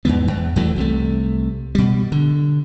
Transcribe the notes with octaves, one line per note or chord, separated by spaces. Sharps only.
E2 G#2 E3 B3
E2
E2 E3 F#3 A3
C2 C3 F3 A3
B2 G3
D3